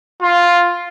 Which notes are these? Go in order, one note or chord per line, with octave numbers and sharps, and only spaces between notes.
F4